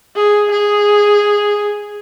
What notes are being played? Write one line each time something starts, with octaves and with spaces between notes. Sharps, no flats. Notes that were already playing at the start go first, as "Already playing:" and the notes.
G#4
G#4